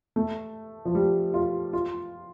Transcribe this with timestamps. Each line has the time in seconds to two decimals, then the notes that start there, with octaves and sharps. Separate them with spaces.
0.16 A3
0.85 F3
0.95 G3
1.34 F4
1.73 F4